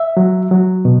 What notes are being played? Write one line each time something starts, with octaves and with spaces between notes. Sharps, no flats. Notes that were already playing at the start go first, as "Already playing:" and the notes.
Already playing: E5
F#3
F#3
B2